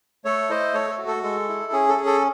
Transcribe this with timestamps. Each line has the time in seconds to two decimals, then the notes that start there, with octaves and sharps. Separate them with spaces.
0.25 A3 A4 C#5
0.50 E4 C5 D#5
0.74 A3 A4 C#5
0.90 A4
0.98 F#4
1.07 A4
1.23 G#3 A4
1.48 E4
1.72 C#4 G#4
1.89 A4
1.97 G#4
2.06 A4